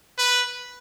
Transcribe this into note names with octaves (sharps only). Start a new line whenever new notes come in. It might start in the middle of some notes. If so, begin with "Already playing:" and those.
B4